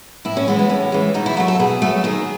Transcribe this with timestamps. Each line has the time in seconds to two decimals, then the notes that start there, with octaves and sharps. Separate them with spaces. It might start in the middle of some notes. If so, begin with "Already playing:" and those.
0.25 A2 E4
0.37 C#4
0.48 E3 G#3 B3
0.59 B3
0.69 A2 C#4
0.92 E3 G#3
1.14 B2 D#4
1.26 E4
1.36 F#3 A3 F#4
1.48 A4
1.59 B2 G#4
1.82 F#3 A3
2.04 D#3 G#4